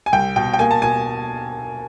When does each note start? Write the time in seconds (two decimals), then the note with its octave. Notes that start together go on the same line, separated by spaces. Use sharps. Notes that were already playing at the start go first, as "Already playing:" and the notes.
0.06 G#5
0.12 C2 G5
0.36 B2 G5
0.53 G5
0.59 A#3 G#5
0.71 A5
0.82 B2 G#5